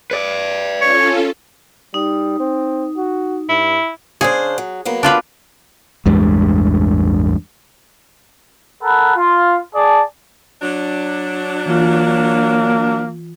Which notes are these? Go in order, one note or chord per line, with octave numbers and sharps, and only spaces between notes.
B4 D5
C#4 F4 A4 C#5
G3 D#4
C4
F#4
G2 E4
C#3 D4 G#4 C5
F#3
F#3 A#3 B3
D4 F4 B4
A1 E2 G2 G#3
A4 A#4 F#5 B5
F4
G#4 D5 A5
F#3 D4
E3 A#3 F4